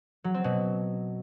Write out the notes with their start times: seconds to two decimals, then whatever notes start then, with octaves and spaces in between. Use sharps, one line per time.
0.24 F#3
0.34 C4
0.44 B2